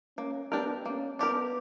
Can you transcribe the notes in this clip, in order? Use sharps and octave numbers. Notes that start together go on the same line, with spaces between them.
A#3 C#4
B3 D4 G4 A#4
A#3 C#4
B3 D4 G4 A#4